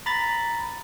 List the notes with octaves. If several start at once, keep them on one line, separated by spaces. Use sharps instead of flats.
A#5 B5 A6